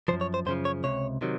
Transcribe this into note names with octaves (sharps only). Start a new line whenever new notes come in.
F#2 C#3 F3 C5
C#5
C5
F#2 C#3 F3 C5
C#5
C#2 C3 C#5
C3 D#3 F#3